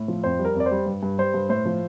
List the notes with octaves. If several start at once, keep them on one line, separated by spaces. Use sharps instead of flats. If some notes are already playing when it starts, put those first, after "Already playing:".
Already playing: A2
F3
F2 C5
G3
A#4
F2 D5
C5
G3
G2
G2
G3 C5
G2
A2 C5
F3